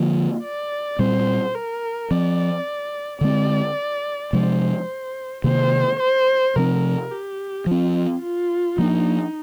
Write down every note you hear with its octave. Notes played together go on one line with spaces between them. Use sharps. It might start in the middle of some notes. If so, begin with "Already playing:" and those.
Already playing: D3 F3 A#3 F4
D5
A#2 G3 C4 C5
A#4
F3 C4 D5
D3 G#3 C4 D5
C3 F3 G#3 D4 C5
C3 D#3 A#3 C5
C5
C3 F3 C4 A#4
G4
F3 C4 F4
F4
F3 A#3 D4 D#4